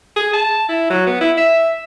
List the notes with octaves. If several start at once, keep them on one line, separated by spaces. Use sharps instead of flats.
G#4
A5
E4
F#3
B3
E4
E5